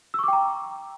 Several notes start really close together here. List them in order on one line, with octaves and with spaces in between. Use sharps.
E6 C#6 D6 G5 A#5